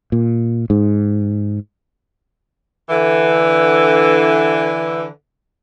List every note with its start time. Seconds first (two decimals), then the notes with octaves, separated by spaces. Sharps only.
0.12 A#2
0.70 G#2
2.89 D3 E3